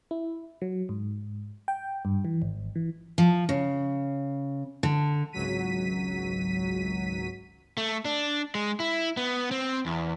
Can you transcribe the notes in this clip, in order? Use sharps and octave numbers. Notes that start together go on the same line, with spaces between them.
E4
F#3
G#2
G5
G2
E3
G#1
E3
F3
C#3
D3
G#1 C#2 F#3 B6 D#7
A3
D4
G#3
E4
B3
C4
E2